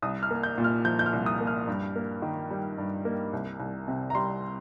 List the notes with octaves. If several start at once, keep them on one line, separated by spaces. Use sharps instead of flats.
C2 D#6
F6
A#3
G6
A#2
F6
F3 G6
G6
F6
C2
D#6
A#3
F6
G2
A#3
D#3
G3
G2
A#3
C2
C2
C3
A#5
G3 C6